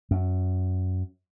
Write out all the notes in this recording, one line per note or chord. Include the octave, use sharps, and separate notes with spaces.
F#2